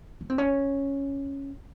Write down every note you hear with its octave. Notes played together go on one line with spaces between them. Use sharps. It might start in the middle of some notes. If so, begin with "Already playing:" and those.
C#4
C4
C#4